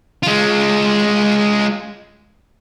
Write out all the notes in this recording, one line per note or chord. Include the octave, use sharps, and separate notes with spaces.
G#3 F4